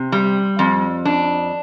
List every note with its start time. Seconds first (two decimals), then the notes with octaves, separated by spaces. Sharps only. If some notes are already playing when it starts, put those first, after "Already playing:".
Already playing: C3
0.12 G3
0.59 F2
1.05 D4